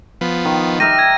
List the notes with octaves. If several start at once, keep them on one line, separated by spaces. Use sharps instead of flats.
F3 B3
D#3
G4 A#4 E5 A#6 D#7
G#6